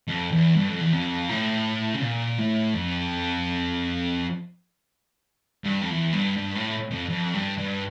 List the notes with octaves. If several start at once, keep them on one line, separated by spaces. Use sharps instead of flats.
F2
E2
G2
F2
E2
F2
A2
C#3
A#2
A2
F2
G2
F2
E2
G2
G2
A2
F2
F2
G2
G2